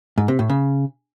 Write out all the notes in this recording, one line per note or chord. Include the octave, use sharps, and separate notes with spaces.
G#2
C3
A2
C#3